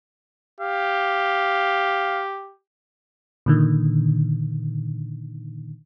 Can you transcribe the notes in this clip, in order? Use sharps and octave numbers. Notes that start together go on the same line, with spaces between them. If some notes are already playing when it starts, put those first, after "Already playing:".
G4 F5
A#2 D3 D#3